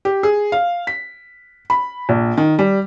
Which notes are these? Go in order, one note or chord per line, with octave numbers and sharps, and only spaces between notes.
G4
G#4
F5
B6
B5
A#1
D#3
G3